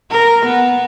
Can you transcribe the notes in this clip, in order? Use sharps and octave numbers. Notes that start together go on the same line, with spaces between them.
A#4
B3